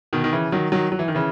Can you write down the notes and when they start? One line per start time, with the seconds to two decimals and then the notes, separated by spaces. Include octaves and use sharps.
0.13 B2 D#3
0.24 D#3
0.32 C#3 E3
0.52 D#3 F#3
0.72 D#3 F#3
0.92 F#3
0.99 E3
1.08 D#3
1.15 C#3 E3